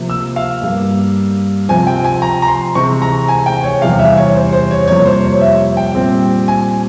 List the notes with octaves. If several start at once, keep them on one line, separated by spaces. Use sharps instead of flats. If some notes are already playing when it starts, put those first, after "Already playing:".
Already playing: C3 F3 A#3
E6
F5
G2 G3 A#3
C3 F3 C4 G#5
G5
G#5
A#5
A#5
C6
C3 E3 G#3 C4 C#6
A#5
G#5
G5
C#5
E2 C3 G3 F5
E5
C#5
C5
C5
C#5
F2 C3 G3 A#3 C#5
C5
C#5
E5
G5
A#2 G3 C4
G#5